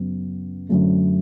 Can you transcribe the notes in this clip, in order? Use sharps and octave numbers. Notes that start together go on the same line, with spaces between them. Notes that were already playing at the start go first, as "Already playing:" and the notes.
Already playing: F#2 C#3 F#3 B3
F#2 D3 F#3 A3